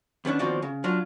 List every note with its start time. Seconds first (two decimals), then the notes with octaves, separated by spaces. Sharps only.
0.25 D#2 B3 C#4 D4
0.39 D#2 B2 F3 C4 F#4 D5
0.62 C#3
0.84 F#3 D4 F4